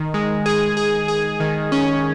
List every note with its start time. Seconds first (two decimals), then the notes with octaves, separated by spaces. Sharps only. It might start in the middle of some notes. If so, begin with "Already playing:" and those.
Already playing: D#3
0.14 G#3
0.46 G#4
0.77 G#4
1.08 G#4
1.40 D#3
1.72 C#4